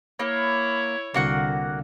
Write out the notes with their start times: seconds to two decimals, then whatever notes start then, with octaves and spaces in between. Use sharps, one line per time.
0.19 A#3 E4 C#5
1.14 C2 D3 A#3 F#4 F#5